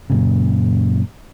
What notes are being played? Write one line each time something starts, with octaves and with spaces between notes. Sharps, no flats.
F#2 A#2 C#3